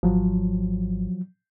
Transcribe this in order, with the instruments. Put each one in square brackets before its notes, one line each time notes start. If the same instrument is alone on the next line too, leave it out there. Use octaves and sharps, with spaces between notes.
[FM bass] G#1 [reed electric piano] F3 F#3